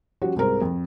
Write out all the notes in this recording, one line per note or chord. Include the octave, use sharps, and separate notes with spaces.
F3 G3 C#4 F4 F#4
C2 G#2 A#4 C5
F2